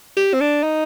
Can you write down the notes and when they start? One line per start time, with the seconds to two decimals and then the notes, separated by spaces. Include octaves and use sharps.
0.17 G4
0.34 C4
0.41 D4
0.63 D#4